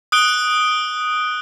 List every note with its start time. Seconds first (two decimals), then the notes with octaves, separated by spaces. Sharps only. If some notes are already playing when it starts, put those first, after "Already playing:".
0.12 D#6 F#6 D7 G7